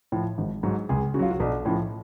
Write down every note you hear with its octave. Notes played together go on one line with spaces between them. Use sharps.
A2 F3
G#1
G#2 F#3
C#2 G#4
C#3 F#4
F#3 F4
F#4
B1 D4
A2 F3 C#4